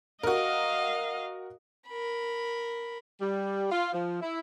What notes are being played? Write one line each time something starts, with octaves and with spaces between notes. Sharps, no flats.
F#4 A#4 D#5 F5
A#4 B5
G3
F4
F3
E4